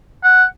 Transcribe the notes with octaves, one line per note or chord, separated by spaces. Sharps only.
F#5